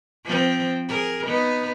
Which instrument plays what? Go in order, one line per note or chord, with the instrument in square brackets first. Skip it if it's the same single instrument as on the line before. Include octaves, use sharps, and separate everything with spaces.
[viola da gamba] F3 C4
G#4 A#4
B3 D#4